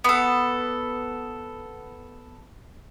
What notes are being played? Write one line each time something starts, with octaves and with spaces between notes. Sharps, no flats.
B3 A4